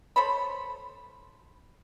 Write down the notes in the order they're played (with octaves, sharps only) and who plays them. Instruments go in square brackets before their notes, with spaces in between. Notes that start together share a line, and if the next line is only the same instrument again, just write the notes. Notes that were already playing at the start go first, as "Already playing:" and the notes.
[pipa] A4 C5 C#5 B5